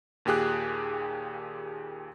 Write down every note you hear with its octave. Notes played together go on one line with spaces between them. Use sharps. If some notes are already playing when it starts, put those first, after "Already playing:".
D#2 A#2 G4 G#4 F#6